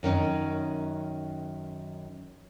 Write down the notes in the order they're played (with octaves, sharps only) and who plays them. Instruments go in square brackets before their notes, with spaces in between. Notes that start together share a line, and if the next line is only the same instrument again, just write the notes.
[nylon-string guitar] F#2 D#3 C#4 D#4